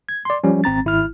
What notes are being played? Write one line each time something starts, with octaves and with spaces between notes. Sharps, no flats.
G#6
D5 C6
F3 G3 C#4
G#1 C4 A#5 A6
G#1 E4 F6